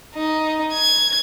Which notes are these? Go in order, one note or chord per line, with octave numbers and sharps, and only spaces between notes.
D#4
G#6